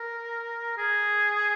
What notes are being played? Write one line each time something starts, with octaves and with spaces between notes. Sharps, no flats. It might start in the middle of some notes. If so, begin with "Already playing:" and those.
Already playing: A#4
G#4